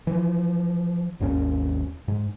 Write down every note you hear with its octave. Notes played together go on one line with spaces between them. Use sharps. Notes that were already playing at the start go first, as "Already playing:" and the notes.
E3 F3
G#1 D#2 C#4
G#2